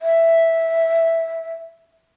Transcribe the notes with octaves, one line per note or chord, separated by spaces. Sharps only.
E5